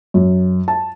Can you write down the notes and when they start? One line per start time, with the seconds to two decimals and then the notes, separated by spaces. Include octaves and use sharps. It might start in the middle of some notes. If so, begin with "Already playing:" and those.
0.14 F#2
0.68 A5